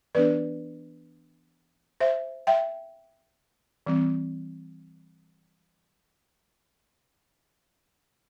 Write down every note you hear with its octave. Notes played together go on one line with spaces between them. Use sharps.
E3 B3 D4 B4 D5
C5 E5
E5 G5
E3 G3 C4